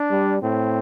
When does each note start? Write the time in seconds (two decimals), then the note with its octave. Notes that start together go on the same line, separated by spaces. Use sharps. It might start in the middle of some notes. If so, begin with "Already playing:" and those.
Already playing: D4
0.11 G3
0.43 A2 C4